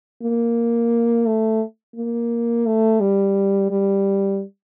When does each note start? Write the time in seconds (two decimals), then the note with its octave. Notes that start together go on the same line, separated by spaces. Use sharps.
0.23 A#3
1.26 A3
1.96 A#3
2.66 A3
3.00 G3
3.70 G3